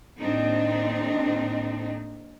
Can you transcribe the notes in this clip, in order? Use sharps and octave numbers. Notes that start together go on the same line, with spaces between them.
D#2 A2 C4 D4 D#4